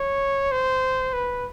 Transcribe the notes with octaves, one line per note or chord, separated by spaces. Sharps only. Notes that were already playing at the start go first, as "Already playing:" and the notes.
Already playing: C#5
C5
B4